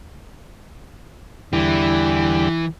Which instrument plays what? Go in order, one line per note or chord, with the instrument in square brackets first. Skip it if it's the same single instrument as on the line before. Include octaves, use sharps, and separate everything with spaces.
[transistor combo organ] E2 D3 G3 [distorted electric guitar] E3